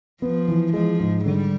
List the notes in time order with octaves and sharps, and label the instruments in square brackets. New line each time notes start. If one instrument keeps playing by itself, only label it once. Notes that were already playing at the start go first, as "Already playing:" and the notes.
[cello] F3 [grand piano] B3
[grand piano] E3
[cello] F3 [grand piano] G#3
[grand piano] G#2
[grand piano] D3 [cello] G3